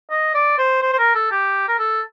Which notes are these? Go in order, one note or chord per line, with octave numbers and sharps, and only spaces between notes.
D#5
D5
C5
C5
C5
A#4
A4
G4
A#4
A4